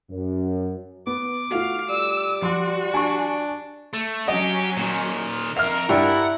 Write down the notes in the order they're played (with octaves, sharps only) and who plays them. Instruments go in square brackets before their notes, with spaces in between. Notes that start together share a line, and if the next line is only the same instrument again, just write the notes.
[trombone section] F#2
[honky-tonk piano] B3 [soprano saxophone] D6
[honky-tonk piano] A3 F4 [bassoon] F#4 [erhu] F5
[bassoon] G3 [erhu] E6
[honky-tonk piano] F3 C6 [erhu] F#4
[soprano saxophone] D4 [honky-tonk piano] G#5 C#6
[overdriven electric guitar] A3
[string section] F#3 C#4 [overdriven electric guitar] G4 [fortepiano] D#5
[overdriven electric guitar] A#2 D#3
[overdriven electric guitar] F2 F5 [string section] A#4 [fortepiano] E5 F6
[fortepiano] G2 G3 D4 [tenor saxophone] E4 [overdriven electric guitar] F#5